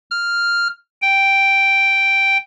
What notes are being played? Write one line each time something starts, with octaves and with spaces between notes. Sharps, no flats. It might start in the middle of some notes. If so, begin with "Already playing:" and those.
F6
G5